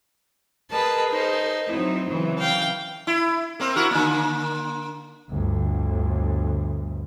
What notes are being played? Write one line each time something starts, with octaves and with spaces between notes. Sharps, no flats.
G#4 A#4 B4 D#5 A5
D#4 C5
F#3 C4 D#4 E4
C#3 E3 F#3
F5 G5
E4
A#3 C4
E4 F#4 A#4
D3 A#3
G1 D2